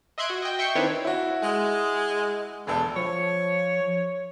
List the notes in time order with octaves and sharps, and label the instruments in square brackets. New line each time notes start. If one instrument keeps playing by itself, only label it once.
[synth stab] D#5 E5 C6 F#6 G#6 D7
F#4
D#5 G5
E5 G5 C#6 C7 C#7
D#3 C4 D4 E4 B4 C#5
[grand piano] E4 F#4
[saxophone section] G#3
[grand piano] E1 A4 [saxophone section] D3 A3
[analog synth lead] F3 [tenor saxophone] C#5